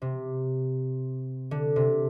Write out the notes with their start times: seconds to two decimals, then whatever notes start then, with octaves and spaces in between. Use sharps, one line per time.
0.02 C3
1.51 D3
1.76 C3